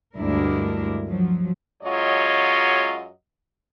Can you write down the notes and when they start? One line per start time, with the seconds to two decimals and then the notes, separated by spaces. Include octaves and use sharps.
0.17 D2 G2 G#3 D4 E4 A#4
1.07 F3 F#3
1.83 F#2 F#3 G#3 F4 C#5 D#5